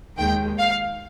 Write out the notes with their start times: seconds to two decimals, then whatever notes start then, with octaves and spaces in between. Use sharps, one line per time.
0.17 D#2 D#3 G#3 G5
0.58 F5